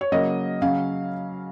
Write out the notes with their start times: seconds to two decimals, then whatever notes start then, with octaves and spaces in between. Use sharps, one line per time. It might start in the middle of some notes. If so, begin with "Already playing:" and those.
0.01 C#5
0.12 C#3 F#3 A#3 D#5
0.62 C#3 F#3 C#4 F5